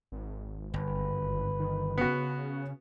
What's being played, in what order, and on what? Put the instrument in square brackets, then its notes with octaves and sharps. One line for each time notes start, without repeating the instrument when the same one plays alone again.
[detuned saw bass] G#1
[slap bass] G1 [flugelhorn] B4
[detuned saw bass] D#3
[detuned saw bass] C#3 [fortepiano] B3 F#4